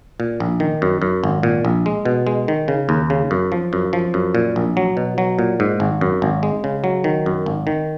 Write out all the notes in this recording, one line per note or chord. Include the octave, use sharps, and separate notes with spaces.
A#2
A#1
D#3
F#2
F#2
G#1
A#2
A#1
G#3
B2
G#3
D#3
C#3
D#2
C#3
F#2
F3
F#2
F3
F#2
A#2
A#1
F#3
B2
F#3
A#2
G#2
G#1
F#2
G#1
G#3
C#3
F#3
D#3
F#2
G#1
D#3